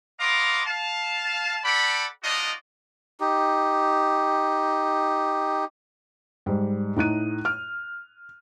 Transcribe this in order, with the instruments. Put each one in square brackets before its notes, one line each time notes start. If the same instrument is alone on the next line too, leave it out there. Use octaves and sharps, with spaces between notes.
[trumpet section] B3 D#5 F5 A#5 C6 D6
F5 A5
A4 D5 F#5 G5 B5
D4 D#4 F4 F#4 D5 D#5
[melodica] D#4 G4
[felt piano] G#2 G3
A2 D#4 F#6 D#7
F6